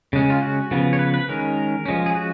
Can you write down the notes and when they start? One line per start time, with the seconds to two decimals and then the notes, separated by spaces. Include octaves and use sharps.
0.13 C#3 G#3 C#4
0.30 F4
0.42 F#4
0.71 C#3 F3 B3
0.93 C#5
0.99 B4
1.14 B4
1.29 D#3 G#3 C#4 A#4
1.86 F3 G#3 C#4
2.06 G#4
2.15 F#4